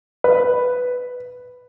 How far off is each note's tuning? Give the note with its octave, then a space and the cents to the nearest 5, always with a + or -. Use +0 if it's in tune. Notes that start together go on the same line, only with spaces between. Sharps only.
B4 +5